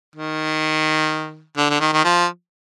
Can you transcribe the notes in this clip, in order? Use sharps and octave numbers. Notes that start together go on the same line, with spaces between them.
D#3
D3
D3
D#3
D#3
F3